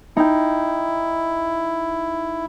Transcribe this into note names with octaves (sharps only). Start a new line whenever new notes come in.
D#4 E4 G5